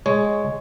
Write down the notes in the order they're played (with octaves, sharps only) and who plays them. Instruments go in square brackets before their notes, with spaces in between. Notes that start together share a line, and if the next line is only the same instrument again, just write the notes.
[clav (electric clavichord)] G#3 C#5